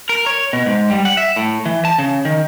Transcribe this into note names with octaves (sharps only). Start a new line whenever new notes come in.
A#4
C#5
B2
G#2
G3
F#5
E5
A2
E3
A5
C#3
D#3